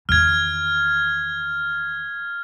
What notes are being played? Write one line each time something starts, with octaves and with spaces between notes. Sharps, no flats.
E2 D#3 F6 G#6